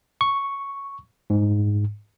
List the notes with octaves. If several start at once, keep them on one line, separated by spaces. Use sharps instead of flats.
C#6
G#2